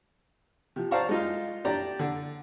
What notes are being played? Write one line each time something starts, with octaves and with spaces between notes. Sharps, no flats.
C3 F3
C5 D5 F5 A5 A#5 C#6
G#3 D#4 F4
D4 G4 D5 G5 A#5
D3